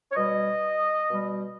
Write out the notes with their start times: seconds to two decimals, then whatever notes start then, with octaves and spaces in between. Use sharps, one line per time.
0.11 C#5
0.15 B2 G3 D#5
1.11 B2 G3